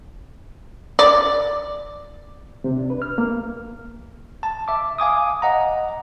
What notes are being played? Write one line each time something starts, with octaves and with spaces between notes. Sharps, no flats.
D5
C3
D4
B4
F6
A#3
A5
E5 D6
F5 G#5 D6 D#6
D#5 F#5 A#5